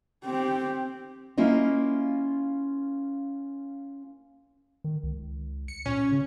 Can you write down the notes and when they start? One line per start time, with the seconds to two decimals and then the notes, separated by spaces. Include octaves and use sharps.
0.24 C4 G4
1.38 A#3 C#4 E4 F4 D#5
4.84 D#3
5.03 C#2
5.68 C#7
5.86 A#2 C#4
6.12 C#3